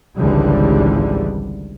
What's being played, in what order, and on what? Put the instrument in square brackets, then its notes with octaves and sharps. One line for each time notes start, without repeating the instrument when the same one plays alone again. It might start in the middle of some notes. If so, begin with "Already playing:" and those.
[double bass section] G#1 C#2 D3 E3 G3